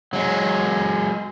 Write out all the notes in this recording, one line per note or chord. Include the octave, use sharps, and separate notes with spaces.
F#3 G#3